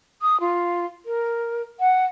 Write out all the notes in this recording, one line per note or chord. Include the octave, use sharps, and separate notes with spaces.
D#6
F4
A#4
F#5